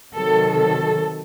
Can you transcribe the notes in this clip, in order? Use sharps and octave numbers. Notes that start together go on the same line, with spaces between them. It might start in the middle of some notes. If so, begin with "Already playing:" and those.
C3 D#3 F#3 A4
A4